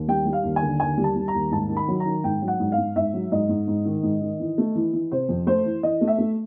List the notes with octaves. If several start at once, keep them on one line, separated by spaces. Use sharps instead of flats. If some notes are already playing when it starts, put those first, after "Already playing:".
Already playing: D#2
G3 G5
G3
F5
D#2
G#5
D3
D#2 G#5
G3
A5
G3
A#5
D#2
G#2 A5
D#3
B5
F#3
A#5
D#3
G#2 G5
F#3
F#5
G#2
F5
G#2
G#2 E5
F#3
G#2 D#5
G#2
G#2
D#3
G#2
D#3
E3
A3
E3
E3
C3 C5
F2
A3 C5
E3
E3 D#5
A3
E5
A3